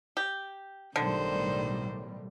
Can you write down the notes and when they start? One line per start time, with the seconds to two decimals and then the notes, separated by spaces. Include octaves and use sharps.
0.17 G4
0.96 B1 A2 D3 D#3 G3 C5